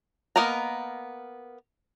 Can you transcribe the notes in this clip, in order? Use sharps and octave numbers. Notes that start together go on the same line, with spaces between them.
A#3 B3 A#4 D#5 A#5